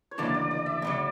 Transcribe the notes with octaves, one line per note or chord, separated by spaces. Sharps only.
C#5
D2 C#3 E3 A#3 D4 D5
D5
D5
E5
D2 C#3 F#3 D5